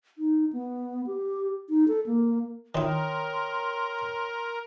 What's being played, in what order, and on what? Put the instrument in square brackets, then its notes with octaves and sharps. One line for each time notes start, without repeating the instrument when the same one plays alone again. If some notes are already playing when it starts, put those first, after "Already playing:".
[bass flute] D#4
B3
G4
D#4
A4
A#3
[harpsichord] D#3 E4 [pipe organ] A#4 [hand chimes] C#5 G5 D#6 [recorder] C6